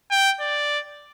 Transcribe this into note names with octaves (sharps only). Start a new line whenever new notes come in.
G5
D5